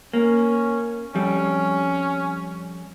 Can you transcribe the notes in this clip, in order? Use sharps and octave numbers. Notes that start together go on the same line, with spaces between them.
A#3 C#4
F2 G3 C#4